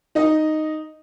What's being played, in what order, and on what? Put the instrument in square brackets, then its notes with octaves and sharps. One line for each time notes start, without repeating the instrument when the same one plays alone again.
[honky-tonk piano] D#4 D#5